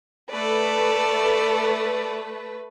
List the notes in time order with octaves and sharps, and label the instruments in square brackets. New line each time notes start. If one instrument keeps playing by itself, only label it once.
[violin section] A3 B4 [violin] A4 D5